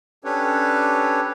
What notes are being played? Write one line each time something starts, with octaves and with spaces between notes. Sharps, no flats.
C#4 D4 G4 A4 B4 C#5